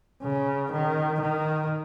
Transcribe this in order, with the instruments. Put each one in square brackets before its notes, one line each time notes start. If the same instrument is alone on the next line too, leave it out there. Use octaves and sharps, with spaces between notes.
[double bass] C#3
D#3
D#3